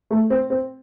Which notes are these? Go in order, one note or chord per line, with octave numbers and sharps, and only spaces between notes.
A3
C4
C4